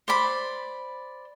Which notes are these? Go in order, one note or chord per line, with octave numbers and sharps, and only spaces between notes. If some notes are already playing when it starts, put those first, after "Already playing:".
C5 D5 B5